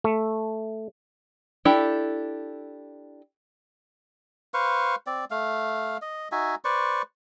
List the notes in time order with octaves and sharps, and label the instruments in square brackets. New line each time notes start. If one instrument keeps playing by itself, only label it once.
[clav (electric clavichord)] A3
[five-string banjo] D4 E4 G4 A4
[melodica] B4 C5 F5 C#6
C4 D5
A3 F5
D#5
D#4 F#4 E5 G#5
B4 C5 D5 C#6